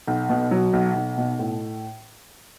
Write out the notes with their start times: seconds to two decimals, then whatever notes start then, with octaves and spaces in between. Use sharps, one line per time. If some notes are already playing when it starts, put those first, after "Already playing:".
0.07 B1
0.29 B2
0.51 F#3
0.73 B1
0.95 B1
1.17 B2
1.39 A2